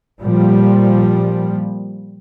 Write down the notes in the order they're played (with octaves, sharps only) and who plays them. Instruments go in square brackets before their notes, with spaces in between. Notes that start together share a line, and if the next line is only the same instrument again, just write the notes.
[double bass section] A#2 F3 G3